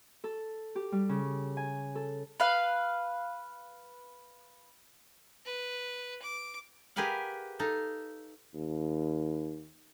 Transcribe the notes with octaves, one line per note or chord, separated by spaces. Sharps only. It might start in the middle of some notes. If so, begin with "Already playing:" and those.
A4
G4
G3
C#3
G#5
A4
B4 F5
B4
D6
G4 G#4 A#4 B4 F5 F#5
D#4 A4 F5
D#2